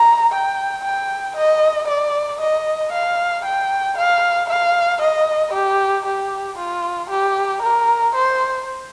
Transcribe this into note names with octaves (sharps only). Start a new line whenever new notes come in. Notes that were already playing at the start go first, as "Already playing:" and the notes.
Already playing: A#5
G5
G5
D#5
D5
D#5
F5
G5
F5
F5
D#5
G4
G4
F4
G4
A#4
C5